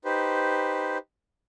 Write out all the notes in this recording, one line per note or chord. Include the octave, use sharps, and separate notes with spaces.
D#4 G4 B4 C5